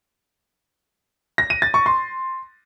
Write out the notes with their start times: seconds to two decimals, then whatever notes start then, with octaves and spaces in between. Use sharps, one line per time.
1.38 A#6
1.50 D#7
1.62 A6
1.74 C#6
1.86 C6